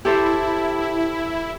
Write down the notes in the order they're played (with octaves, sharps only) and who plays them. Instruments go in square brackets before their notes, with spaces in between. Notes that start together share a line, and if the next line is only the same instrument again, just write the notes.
[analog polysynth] E4 [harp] G4 A4 C5